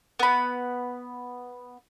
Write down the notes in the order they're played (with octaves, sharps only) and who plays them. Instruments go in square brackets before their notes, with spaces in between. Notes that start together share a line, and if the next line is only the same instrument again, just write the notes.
[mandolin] B3 B5